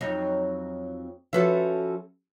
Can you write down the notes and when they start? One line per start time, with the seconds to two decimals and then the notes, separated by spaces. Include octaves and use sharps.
0.01 F2 F#3 D#4
1.33 F3 C#4 F#4 A4 B4 E5